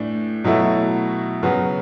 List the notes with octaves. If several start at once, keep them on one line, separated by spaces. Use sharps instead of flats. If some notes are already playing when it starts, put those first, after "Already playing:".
Already playing: A2 E3 A3 D4
B2 F#3 A3 E4
C#3 F#3 B3